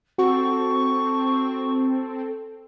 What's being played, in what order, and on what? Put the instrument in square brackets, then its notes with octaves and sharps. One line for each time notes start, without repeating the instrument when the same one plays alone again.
[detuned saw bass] C4 [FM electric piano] F#4 [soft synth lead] A4 [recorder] C#6